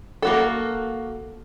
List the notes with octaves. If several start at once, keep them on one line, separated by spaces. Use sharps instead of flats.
A#3 F#4 A4